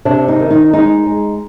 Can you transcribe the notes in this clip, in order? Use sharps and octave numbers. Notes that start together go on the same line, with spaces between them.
C3 D4
D#4
D#3
D#4
G#3 D#4
G#3